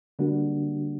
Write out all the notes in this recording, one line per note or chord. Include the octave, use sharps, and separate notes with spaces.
D3 G3 A#3 D4 F#4